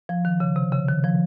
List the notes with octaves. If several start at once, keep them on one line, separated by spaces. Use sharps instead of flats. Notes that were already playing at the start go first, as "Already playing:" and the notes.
F3
D#3
C#3
C3
C#3
D#3
F3